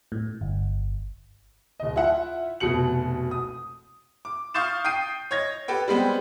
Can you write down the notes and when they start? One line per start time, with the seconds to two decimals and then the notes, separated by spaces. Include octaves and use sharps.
0.12 A2
0.41 G1
1.80 D1 D#5
1.96 E4 F4 E5 F#5
2.60 F1 B2 F#4 C#7 F#7
3.31 D#6
4.25 D6
4.54 F5 C#6 D#6 G6 A6 E7
4.85 G5 D#6 G6 C7 D#7
5.31 C#5 D#5 G#6 A#6
5.68 G4 A4 B4 G5
5.88 G3 G#3 B3 C4